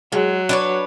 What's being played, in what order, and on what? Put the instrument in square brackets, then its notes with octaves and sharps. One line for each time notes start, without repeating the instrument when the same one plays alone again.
[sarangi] F#3 [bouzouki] G#3
[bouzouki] D4 B4 C#5